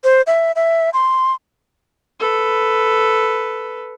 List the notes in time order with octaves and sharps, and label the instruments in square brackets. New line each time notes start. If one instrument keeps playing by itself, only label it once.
[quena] C5
E5
E5
C6
[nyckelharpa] A4 B4